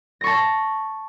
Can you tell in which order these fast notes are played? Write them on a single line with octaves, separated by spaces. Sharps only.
A#6 C#6 A5